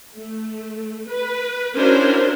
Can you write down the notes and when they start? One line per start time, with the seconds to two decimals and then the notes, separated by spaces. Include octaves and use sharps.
0.16 A3
1.08 B4
1.76 C#4 D4 E4 F#4 A#4 C5